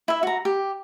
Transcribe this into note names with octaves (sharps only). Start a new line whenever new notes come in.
E4 E5
F#4 A#5
G4